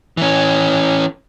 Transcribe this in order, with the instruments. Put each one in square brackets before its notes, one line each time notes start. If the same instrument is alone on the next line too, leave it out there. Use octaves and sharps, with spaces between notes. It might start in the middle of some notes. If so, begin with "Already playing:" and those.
[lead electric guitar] E3 C#4